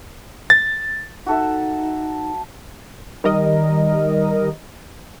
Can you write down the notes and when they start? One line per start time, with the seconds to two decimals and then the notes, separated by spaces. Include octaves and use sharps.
0.50 A6
1.26 D#4 F#4 A4 E5
3.24 D#3 G3 A#4 D#5